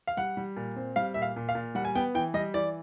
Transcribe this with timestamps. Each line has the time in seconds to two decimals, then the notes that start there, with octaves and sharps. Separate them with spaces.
0.07 F5
0.17 G3 F#5
0.37 G3
0.56 A#2
0.76 C4
0.96 G3 F5
1.14 A#2 E5
1.22 F5
1.36 A#2
1.49 F5
1.55 A#2
1.75 G3 F#5
1.85 G#5
1.95 B3 G5
2.15 E3 G5
2.34 G3 D#5
2.54 E3 D5